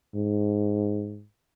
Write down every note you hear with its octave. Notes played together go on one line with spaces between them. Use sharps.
G#2